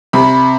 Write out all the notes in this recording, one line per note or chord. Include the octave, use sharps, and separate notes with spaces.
C3 B5